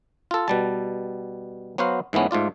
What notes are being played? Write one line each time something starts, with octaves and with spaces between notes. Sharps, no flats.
F4 A4
B2 G3 A5
F#3 B3 F#4 C5 F5
G#2 E3 A3 B3 C#4
G#2 A3 F4 D5